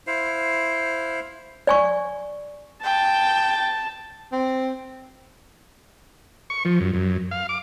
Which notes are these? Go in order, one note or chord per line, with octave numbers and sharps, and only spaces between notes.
E4 C5 F5
D5 G#5 C#6
G5 A5
C4
C#6
F3
F#2
F#2
F5
D6